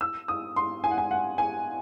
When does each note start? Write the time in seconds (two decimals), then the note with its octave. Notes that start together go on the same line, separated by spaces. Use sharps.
0.01 E6
0.28 D#6
0.56 C6
0.84 G#5
0.91 F#5
0.98 G#5
1.11 F#5
1.38 G#5